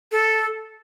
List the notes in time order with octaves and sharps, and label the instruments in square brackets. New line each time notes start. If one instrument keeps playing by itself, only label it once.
[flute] A4